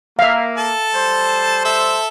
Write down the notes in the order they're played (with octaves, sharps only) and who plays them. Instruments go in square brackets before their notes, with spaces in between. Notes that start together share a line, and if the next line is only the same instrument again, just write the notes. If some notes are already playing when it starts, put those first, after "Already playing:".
[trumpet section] A#3 [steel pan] E5 F5
[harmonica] A4 A5
[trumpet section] G3 C5
[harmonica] A4 E5